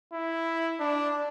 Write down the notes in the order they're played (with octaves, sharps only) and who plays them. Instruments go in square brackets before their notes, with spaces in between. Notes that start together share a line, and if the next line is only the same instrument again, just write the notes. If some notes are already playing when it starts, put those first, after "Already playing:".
[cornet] E4
D4